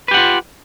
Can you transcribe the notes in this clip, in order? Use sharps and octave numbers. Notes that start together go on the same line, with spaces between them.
F4 G4 B4 F#5